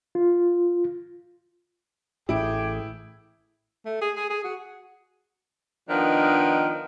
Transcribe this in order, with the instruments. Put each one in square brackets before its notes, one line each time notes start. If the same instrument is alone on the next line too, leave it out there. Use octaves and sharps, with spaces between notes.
[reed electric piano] F4
[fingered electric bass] A1 A2 [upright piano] E4 D7 [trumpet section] G#4 G5 D6
[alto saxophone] A3
G#4
G#4
G#4
F#4
[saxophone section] D#3 F3 B3 D4 D#4